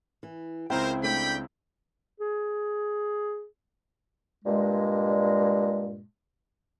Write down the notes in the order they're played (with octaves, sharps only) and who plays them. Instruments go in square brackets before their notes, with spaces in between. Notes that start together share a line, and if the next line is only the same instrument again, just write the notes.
[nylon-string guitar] E3
[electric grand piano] C#2 C4 E4 [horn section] A#4 C5 [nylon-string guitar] G5
[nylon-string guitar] A3 D4 D5 [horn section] G5 [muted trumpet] B5
[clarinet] G#4
[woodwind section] G2 A#2 G#3